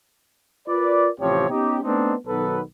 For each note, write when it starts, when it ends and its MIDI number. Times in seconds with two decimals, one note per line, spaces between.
0.68 1.09 65
0.68 1.09 70
0.68 1.09 71
0.68 1.09 74
1.21 1.46 33
1.21 1.46 48
1.21 1.46 53
1.21 1.46 60
1.21 1.46 67
1.21 1.46 73
1.50 1.79 59
1.50 1.79 61
1.50 1.79 63
1.50 1.79 67
1.84 2.14 57
1.84 2.14 59
1.84 2.14 60
1.84 2.14 62
1.84 2.14 63
2.27 2.61 35
2.27 2.61 51
2.27 2.61 54
2.27 2.61 59
2.27 2.61 69
2.27 2.61 71